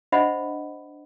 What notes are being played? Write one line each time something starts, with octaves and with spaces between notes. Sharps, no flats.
D4 C5 D#5 E5 F#5 B5